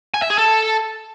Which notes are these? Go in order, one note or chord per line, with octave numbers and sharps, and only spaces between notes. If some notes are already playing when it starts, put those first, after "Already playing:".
G#5
E5
G#4
A4